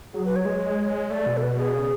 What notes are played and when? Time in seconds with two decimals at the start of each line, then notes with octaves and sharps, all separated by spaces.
0.14 F#3 G#4
0.25 B4
0.36 C#5
0.46 G#3
1.10 A3 D5
1.27 B2
1.37 A4
1.43 B4
1.58 G#4
1.75 C#3